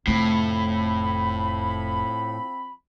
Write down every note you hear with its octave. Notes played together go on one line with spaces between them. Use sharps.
F1 A2 F3 A3 C4 B5